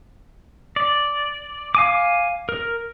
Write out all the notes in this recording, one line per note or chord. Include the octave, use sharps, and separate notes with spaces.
D5
F5 G#5 D6
A#4